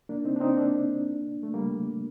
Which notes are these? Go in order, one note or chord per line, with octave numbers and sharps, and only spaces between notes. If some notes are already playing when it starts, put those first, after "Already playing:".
A#3 D4
C4 D#4
D4
C4 D#4
A#3 D4
A3
G3 A#3